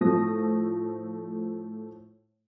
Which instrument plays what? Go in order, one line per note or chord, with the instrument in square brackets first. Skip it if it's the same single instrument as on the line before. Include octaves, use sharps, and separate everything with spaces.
[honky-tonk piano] A2 F3 A3 A4 D#6 A#6